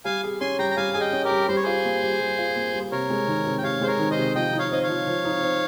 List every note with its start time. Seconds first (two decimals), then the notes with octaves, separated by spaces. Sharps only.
0.05 G3 F5 G#5
0.24 G#4
0.40 C#4 G#5 C6
0.58 G3 G5 A#5
0.71 A#5
0.77 G3 F5 G#5
0.94 G#4 G#5
1.00 D#5 G5
1.13 C#4
1.24 G4 A#4
1.31 G3
1.48 G3 C5
1.56 C#5
1.63 F4 G#4 C5
1.85 A#3
2.02 G3
2.20 G3
2.38 F4
2.56 A#3
2.74 G3
2.92 C3 A#4 C#5
3.10 G#3
3.27 D#3
3.45 C3
3.58 G5
3.63 C3 C#5 F5
3.81 G#3 C5
3.87 A#4 C#5
3.99 D#3
4.11 C5 D#5
4.17 C3
4.35 F3 D#5 G5
4.53 D#4
4.59 C#5 F5
4.71 C4 D#5
4.83 C#5 F5
4.89 F3
5.07 F3
5.25 D#4
5.42 C4